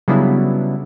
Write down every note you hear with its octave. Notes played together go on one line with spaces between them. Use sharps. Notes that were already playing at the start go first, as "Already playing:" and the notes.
C#3 F#3 G3 B3 D4 E4